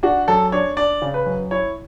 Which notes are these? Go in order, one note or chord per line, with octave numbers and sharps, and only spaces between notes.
D4 F#4
F#2 A4
D4 C#5
D4 D5
C#3
B4
F#2
E4 C#5